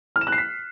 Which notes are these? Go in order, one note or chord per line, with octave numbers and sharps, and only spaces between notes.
F6
E7
F#6
C7
B6